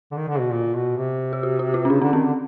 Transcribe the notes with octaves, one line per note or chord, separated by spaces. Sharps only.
D3
D#3
D3
B2
A#2
B2
C3
G4
F#4
F#4
F4
C#4
C#3 D4
D3 C#4
D#3 C4
D3